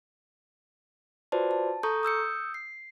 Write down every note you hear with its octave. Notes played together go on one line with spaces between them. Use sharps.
F4 F#4 B4 C5 D5 A5
A5
A4 A#5 C#6 D#6 G6
D#6 E6 G6 C#7
C7